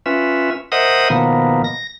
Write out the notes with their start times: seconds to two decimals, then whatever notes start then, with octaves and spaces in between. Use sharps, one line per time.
0.06 C#4 F4 B4 E5
0.72 A#4 C5 D#5 E5 F#5 D#6
1.10 B2 D#3 F3 A#3 B3
1.64 A#6